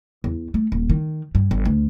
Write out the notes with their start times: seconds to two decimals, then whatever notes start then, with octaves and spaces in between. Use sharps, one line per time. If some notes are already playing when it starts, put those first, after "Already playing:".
0.24 E2
0.54 A3
0.72 D#1
0.90 D#3
1.35 G2
1.51 G1
1.65 D2